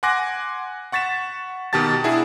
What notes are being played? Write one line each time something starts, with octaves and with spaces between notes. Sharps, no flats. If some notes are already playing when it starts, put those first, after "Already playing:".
F#5 G#5 C6 D6 F#6 A#6
F#5 C#6 A6 B6 E7
B2 D#3 G4 A5 A6
D4 E4 F#4 G#4